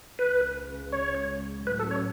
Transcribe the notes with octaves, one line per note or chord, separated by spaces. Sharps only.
C#2 C#3 G#3 B4
C#5
A2 F#3 C#4 B4
A4
C#5